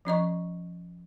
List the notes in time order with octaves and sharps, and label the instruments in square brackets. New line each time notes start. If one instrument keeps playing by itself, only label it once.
[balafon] F3 C#4 D#5 C#6